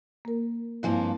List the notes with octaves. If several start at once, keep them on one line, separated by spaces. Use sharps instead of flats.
A#3 A#4
G2 F3 A#3 C4 E4 G#5